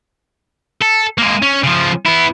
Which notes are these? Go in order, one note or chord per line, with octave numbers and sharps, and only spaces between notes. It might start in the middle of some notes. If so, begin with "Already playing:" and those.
A4
G#3 A#3
C#4
C#3 F3
B3 E4